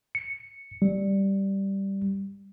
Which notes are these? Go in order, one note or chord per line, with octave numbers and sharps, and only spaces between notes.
C#7
G3